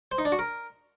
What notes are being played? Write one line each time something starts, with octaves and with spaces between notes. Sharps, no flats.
C5
D#4
D4
F#4
A#4